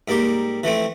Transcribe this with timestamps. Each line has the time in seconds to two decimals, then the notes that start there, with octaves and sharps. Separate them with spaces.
0.08 G#2 G3 A#3 G4
0.63 E3 F3 A3 C4